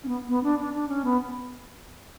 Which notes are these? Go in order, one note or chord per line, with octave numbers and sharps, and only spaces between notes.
C#4
B3
B3
D4
D4
D4
C#4
B3